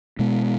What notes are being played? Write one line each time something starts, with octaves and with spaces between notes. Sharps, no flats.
B2 G#3 B3